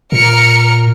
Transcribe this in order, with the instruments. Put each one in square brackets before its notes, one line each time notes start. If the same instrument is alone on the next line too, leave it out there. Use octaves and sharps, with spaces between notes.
[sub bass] A#2 [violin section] A#4 F6 C#7